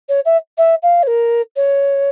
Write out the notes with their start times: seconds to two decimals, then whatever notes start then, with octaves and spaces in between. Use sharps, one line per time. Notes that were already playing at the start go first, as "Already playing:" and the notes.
0.09 C#5
0.25 E5
0.58 E5
0.83 F5
1.03 C#5
1.07 A#4
1.56 C#5